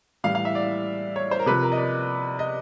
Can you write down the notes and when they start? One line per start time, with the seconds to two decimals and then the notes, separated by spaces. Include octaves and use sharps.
0.24 A2 E3 G3 F5
0.35 F5
0.45 E5
0.55 D5
1.16 C#5
1.31 C5
1.39 A#4
1.46 C3 F3 B4
1.63 A#4
1.72 D#5
1.77 D5
2.39 D#5